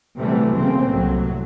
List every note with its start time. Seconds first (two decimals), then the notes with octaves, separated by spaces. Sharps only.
0.18 C3 E3 F#3 G3 A3
0.55 B1 C#3 F3 A#3 C4
0.88 C2 A2 F#3